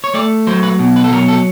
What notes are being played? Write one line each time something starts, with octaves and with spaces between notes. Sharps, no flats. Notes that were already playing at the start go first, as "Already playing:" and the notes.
C#5
A3 D5
F#3 C5
B4
B2
B4
A4
F#3 A#4
A4